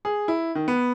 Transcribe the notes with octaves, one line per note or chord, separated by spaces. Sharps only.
G#4
E4
D#3
B3